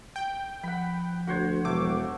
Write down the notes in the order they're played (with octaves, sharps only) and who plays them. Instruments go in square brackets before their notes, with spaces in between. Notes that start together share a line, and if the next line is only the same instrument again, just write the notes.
[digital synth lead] G5
[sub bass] F3 [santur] F#5 B5
[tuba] D2 [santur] F#4 C5 C#5
[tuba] E1 [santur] A3 [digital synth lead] D6